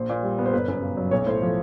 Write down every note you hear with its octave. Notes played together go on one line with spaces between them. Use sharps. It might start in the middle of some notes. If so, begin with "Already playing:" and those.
Already playing: A#1 C5
A#2
G3
B3
C5
G1 B4
F#2
C#3
F#3
B1 C#5
A2 C5
F3